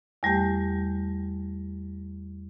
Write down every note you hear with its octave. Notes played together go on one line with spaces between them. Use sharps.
E2 G3 A3 G4